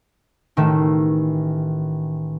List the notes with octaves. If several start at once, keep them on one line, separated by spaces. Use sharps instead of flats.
A1 D#3 A3 E5